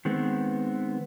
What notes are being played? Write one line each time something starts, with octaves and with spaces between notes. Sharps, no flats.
D#3 G#3 B3 C4